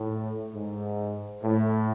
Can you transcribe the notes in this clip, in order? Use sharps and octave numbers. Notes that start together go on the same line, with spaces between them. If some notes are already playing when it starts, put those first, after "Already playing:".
Already playing: A2
G#2
A2